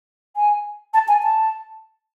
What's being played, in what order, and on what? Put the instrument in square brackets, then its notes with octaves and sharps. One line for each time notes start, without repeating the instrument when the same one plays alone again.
[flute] G#5
A5
G#5
A5